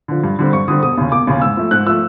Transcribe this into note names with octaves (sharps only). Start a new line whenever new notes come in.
D3 F3
G2
D3 G3 C4
G2 C#6
D3 G3 C4 D#6
E1 D#6
D#2 C#3
E1 D6
D#2 C#3
G#2 E6
F3 A3
G#2 F#6
F3 A3 E6